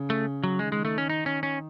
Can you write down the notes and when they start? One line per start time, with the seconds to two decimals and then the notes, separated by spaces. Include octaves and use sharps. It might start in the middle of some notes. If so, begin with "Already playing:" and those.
Already playing: C#3
0.10 A3
0.44 F#3
0.59 D#3 G#3
0.72 G#3
0.85 A3
0.98 C#4
1.10 D#4
1.26 C#4
1.43 C#4